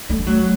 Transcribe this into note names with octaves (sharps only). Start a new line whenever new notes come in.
A3
F#3